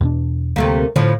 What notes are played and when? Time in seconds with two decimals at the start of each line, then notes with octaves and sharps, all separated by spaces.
0.01 E2 B2 D4
0.56 D2 C3 A3 A#3
0.96 A2 D3 F3